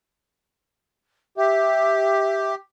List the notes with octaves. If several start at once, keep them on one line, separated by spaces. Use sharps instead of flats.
G4 E5